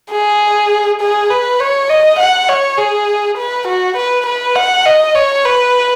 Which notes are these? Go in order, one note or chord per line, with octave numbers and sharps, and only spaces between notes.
G#4
G#4
B4
C#5
D#5
F#5
C#5
G#4
B4
F#4
B4
B4
F#5
D#5
C#5
B4